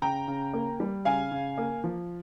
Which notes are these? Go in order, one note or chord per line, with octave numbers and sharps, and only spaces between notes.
C#3 G5 A#5
C#3
A#3
G3
C#3 F5 G#5
C#3
A#3
F3